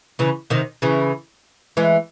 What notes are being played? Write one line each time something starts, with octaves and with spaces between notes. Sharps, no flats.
C#3 E3
C3 D#3
C#3 E3
E3 G#3